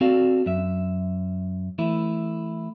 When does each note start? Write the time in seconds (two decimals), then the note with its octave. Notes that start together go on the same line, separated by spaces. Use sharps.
0.01 C4 F#4 A4 D5 F5
0.46 F#2 E5
1.78 E3 A3 E4